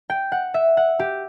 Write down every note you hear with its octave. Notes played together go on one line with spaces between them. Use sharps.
G5
F#5
E5
F#5
G4